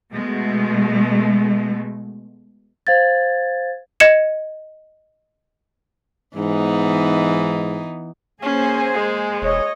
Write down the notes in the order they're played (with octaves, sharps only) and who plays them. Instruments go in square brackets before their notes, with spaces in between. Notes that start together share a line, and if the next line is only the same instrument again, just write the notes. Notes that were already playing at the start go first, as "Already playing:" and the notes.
[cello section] B2 G#3 A3
[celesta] C5 F5 G#6 A6
[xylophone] D#5 G#6 C#7 E7
[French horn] G#2 [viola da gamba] E3 B3 D#4
[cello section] A#3 G#4 C5 [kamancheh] C#4 [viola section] G#5
[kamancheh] G#3
[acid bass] E1 [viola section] C#5 D#5